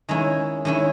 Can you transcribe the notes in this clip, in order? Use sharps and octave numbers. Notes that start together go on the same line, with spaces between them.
D#3 G#3 C#4 E4
D#3 G#3 C#4 E4